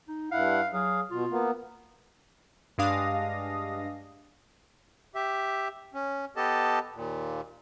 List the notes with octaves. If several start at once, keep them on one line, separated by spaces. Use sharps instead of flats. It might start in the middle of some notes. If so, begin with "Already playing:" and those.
D#4
G2 E4 F5 F#5
F#3 G#4 F5
B2 F4
A#3 B3
G2 G#3 D4 F5 D#6 A#6
G4 E5
C#4
B3 G4 A4 D#5 A5
D#2 A#2